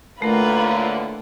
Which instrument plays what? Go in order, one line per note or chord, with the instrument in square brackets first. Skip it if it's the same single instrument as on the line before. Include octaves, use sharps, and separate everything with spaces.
[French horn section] A2 D3 A#3 [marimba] A3 A#4 [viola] F4 B4